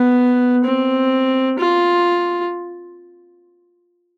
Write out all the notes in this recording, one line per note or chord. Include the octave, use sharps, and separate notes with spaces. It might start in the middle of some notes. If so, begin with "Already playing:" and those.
Already playing: B3
C4
F4